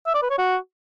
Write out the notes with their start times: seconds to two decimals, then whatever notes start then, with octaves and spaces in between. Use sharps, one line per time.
0.06 E5
0.14 D5
0.22 B4
0.30 C#5
0.38 F#4